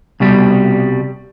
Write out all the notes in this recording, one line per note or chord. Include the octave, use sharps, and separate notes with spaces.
C2 B2 G3